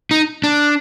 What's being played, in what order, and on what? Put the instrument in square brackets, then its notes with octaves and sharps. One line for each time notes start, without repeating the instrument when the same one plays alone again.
[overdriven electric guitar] D#4
D4